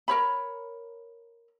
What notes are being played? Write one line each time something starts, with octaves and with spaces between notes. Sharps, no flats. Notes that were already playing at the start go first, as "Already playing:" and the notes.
A#4 C#5 B5